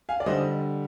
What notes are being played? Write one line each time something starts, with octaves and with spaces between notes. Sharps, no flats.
F5 G#5
D5
D3 G3 C5 D#5